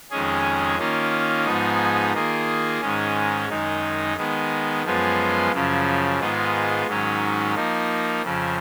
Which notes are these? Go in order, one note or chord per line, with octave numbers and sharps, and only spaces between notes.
F2 D#3 G#3 C#4 G#4
D#3 A#3 C#4 F4
G#2 F3 B3 D#4 G#4
D#3 A#3 F4 G#4
G#2 D#3 G#3 C#4
F#2 D#3 G#3 D#4
D#3 G#3 B3
F#2 F3 G#3 B3 F4
F#2 C#3 F3
G#2 D#3 G#3 B3 F4
G#2 D#3 F#3 C#4
F3 A#3 D#4
F2 C#3 F3